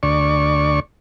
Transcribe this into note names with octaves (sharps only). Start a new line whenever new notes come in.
D2 D5 C#6